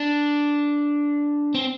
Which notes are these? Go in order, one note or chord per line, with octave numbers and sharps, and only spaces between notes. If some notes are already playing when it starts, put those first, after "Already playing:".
Already playing: D4
C4